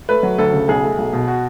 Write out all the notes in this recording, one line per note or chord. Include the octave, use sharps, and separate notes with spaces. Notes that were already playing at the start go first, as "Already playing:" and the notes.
A3 B4
F#3
D2 A4
C#3
B1 G#4
A3
B1
B2
F#4